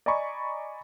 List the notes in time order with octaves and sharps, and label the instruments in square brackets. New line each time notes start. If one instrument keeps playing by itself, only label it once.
[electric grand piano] D5 D#5 G#5 A#5 B5 C#6